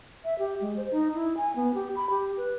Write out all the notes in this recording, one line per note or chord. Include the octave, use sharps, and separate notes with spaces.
E5
G4
G#3
C5
D#4
E4
G#5
B3
G4
B5
G4
B4